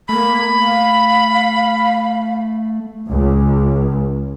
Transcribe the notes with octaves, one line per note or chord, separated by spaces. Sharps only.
A3 A#3 B5
F5
C#2